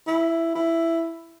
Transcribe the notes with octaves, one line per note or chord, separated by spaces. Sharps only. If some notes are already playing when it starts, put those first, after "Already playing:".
E4
E4